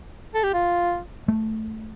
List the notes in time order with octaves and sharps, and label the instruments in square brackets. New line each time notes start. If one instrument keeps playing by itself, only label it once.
[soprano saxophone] A4
G4
F4
[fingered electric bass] A3